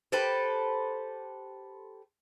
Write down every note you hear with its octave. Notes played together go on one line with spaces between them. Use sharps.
G4 A4 B4 C5